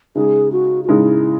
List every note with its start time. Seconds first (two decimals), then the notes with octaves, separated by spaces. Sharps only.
0.15 C#3 G#3 D#4 G#4
0.52 F#4
0.84 F#4
0.89 C#3 G#3 D#4 E4